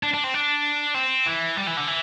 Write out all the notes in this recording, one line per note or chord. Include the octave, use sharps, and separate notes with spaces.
D4
D4
C4
D4
C4
E3
G3
E3
D3
E3